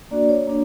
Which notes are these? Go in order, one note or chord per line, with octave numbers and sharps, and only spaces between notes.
A#3 D4 F#4 D5
C#5
A#3 D4